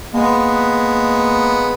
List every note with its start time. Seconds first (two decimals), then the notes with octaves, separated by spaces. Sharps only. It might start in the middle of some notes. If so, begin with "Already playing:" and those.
0.14 G#3 A#3 B3